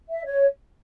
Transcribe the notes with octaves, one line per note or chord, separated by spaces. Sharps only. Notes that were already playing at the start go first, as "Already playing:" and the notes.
E5
C#5